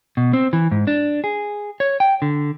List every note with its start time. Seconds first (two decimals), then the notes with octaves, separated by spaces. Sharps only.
0.17 B2
0.33 C4
0.53 E3
0.71 G#2
0.87 D4
1.24 G#4
1.80 C#5
2.00 G5
2.22 D3